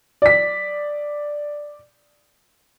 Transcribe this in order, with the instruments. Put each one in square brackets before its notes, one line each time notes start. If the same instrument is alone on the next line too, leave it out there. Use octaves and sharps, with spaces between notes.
[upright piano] D5 B6